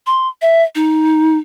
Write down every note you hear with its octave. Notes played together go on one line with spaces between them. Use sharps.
C6
E5
D#4